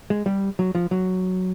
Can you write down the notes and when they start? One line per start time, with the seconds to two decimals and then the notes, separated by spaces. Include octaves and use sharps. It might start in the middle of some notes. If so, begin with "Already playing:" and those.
0.10 G#3
0.26 G3
0.59 F#3
0.75 F3
0.91 F#3